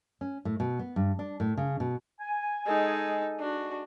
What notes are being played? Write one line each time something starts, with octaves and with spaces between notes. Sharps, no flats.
C#4
A2
B2
B3
G2
D4
A2
C#3
B2
G#5
G#3 D#4 A4
D4 F#4